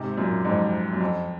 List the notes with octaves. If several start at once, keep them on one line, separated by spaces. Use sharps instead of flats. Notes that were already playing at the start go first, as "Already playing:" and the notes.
Already playing: G#2 C3
F#2 A#2
F2 G#2
F#2
F2